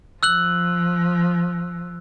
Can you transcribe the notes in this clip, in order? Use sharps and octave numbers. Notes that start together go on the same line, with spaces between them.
F3 E6 F#6 F#7